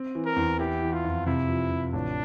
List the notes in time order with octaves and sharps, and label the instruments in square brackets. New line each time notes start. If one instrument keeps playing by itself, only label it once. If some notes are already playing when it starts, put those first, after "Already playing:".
Already playing: [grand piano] C4
E3
[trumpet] A#4
[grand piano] E2
[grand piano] E4 [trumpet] G4
[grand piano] E3
[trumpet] F4
[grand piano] F2
[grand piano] C3 [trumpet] E4
[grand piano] F3
C3
[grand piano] A1 [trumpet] D4